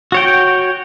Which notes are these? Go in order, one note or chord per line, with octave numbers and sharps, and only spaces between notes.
F#4 C#5 G5